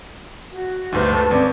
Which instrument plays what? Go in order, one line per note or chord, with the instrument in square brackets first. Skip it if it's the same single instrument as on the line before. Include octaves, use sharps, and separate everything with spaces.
[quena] F#4
[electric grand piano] D2 G2 [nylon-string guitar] D#4 B4 [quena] C5
[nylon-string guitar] G#3 A3 [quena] A4
[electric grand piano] G#1 [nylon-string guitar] C4 C#4 B4 [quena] D5